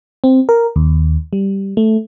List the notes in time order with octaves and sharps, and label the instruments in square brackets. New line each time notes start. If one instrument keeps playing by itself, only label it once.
[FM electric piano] C4
A#4
D#2
G3
A3